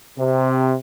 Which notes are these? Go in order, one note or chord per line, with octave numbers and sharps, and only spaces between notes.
C3